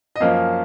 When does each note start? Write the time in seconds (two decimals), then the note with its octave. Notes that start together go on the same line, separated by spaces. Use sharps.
0.16 D#5
0.20 F#2 F3 A#3 C#4 F5